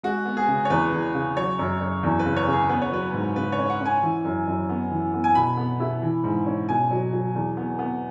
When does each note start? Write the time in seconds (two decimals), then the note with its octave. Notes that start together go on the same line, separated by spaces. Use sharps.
0.03 G#3 F#4
0.25 B3
0.37 G#4
0.48 C#3
0.65 C#5
0.70 E2 B4
0.92 E2
1.14 C#3
1.37 F#3 C#5
1.59 F#2
1.80 F#2
2.03 E2
2.19 B4
2.25 C#3
2.36 C#5
2.47 C#3
2.53 G#4
2.69 B3 B4
2.82 C#5
2.92 F#3 B4
3.14 G#2
3.36 C#3 B4
3.52 C#5
3.58 C#4
3.70 F#5
3.80 C#4
3.85 G#5
4.02 E3
4.25 F#2
4.47 F#2
4.69 B3
4.91 E3
5.14 B3
5.24 G#5
5.35 B2 B5
5.57 B3
5.80 E4
6.02 E3
6.24 G#2
6.46 C#4
6.68 B2 G#5
6.91 F#3
7.13 F#3
7.35 E2
7.57 B3
7.79 B3